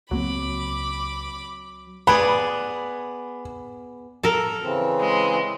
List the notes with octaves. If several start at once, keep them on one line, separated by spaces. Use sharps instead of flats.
C#2 F#3 A#3 C4 B5 D6
B3 G#4 D5 B5
A4 A#4
C#3 E3 C4
G#3